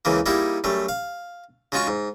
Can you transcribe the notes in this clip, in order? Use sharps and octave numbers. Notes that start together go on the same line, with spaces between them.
C#2 C#3 E3 A#3
G3 A#3 D#4 E4 G#4
F#2 G3 A3
F5
C#3 G#3 F4 F#4 C#6
G#2